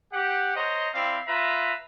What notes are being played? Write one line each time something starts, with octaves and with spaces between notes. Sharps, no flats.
G4 F#5
C5 C#5 D#5 A#5
C4 E4 D5 F5
F4 B4 E5 A#5